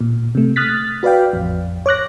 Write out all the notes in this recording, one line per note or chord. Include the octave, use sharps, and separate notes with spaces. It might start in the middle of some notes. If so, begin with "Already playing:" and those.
A#2
C3 A3
D#6 F6 F#6 A6 B6
F#4 B4 D5 F5 G5
A1 F2
C#5 D6 F#6 A#6